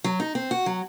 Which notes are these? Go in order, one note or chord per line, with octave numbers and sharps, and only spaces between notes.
F#3
D#4
C4
F#4
F#3